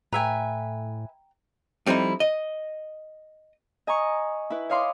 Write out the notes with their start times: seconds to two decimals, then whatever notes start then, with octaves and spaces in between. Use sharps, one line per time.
0.12 A2 B4 E5 G5 G#5 A#5
1.86 F2 G3 C4 D#4 E4
2.20 D#5
3.87 D#5 G#5 A#5 C#6
4.50 E4 B4
4.69 C#5 D#5 F5 B5 C6 D6